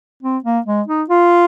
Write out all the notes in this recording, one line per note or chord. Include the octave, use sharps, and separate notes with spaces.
C4
A#3
G#3
D#4
F4